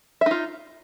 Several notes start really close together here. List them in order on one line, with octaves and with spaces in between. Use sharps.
E5 D#4 F4